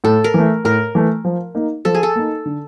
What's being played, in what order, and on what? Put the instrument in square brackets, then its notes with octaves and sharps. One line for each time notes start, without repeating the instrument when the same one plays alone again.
[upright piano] A2 [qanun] A4
[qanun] A#4
[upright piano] E3 A3
[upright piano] A2 [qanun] A#4
[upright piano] E3 A3
F3
A#3 D#4
[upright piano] F3 [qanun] A4
[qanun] G#4
A4
[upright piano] A#3 D#4
D3